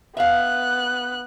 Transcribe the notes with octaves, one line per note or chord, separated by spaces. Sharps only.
B3 E5 F5 F#6